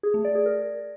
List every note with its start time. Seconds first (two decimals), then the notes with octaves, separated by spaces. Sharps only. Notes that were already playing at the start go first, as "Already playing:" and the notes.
0.03 G#4
0.14 A3
0.25 D5
0.35 G#4
0.46 A#4